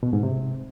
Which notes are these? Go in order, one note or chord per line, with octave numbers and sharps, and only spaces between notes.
B2
G#2
C3